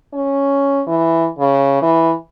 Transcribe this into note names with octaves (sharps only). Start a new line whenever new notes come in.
C#4
E3
C#3
E3